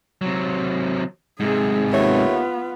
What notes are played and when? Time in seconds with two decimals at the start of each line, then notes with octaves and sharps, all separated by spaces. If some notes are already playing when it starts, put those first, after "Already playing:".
0.21 C3 F#3
1.40 G#2 C3 G#4
1.92 D#2 A3 B3 F4 C#5